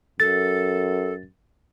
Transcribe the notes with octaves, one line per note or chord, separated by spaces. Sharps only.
F#2 A4 A6